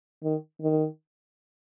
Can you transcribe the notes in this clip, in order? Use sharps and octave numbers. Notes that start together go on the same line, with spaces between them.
D#3
D#3